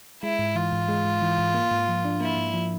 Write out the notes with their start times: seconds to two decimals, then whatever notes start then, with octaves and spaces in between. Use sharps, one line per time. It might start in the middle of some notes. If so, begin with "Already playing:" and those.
0.23 G#3 E4
0.39 G#2
0.55 E3 F4
0.72 G#2
0.88 G#3
1.05 G#2
1.22 E3
1.38 G#2
1.54 A#3
1.71 G#2
1.88 F3
2.05 D4
2.20 A#3 E4
2.37 G#2
2.54 F3